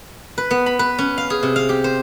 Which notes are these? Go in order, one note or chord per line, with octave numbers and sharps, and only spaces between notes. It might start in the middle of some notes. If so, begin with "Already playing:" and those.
B4
B3
B5
B4
C#4
F5
G#4
C3
F5
G4
C5